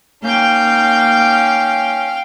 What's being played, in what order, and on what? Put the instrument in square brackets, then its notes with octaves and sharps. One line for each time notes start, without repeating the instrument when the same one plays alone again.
[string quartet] A#3 D#4 G6 [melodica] C#4 [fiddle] F5 G5